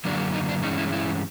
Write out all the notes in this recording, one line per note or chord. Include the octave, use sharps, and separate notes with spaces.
F#2 D3 F#3 A#3 D4
D#4
D4
G2 E3 G#3 C#4 D#4
E4
E4